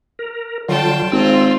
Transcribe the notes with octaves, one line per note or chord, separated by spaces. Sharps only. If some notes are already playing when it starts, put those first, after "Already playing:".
A#4
D3 F#3 F4 G5 A5
G#1 C4 F4 E6